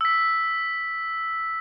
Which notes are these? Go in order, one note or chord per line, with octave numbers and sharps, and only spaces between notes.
E6 B6